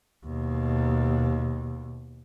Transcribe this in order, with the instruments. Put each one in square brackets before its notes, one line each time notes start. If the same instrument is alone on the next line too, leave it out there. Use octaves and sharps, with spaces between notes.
[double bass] D#2 B2